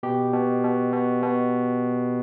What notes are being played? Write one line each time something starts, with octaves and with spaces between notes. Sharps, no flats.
B2 G4
B2
B2
B2
B2